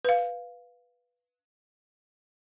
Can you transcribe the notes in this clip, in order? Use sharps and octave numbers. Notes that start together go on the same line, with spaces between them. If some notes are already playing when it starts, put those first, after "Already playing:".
B4 F5